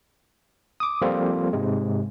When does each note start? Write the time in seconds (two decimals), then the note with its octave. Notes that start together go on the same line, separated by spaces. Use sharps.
0.80 D6 D#6
1.02 F3 G3 A#3 C4 F4 A4
1.53 G#2 C3 G#3